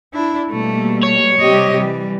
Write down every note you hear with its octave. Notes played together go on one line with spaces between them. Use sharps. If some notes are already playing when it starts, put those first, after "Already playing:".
D4 E4
B2 G3 A3 A#3
C#5
C3 G3 G4 D#5
E3 G3